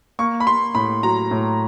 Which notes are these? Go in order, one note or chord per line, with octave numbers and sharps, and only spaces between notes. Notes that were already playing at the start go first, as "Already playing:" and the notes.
A#3 C#6
B5
A#3 C6
A2 B5
F#3 A#5
A2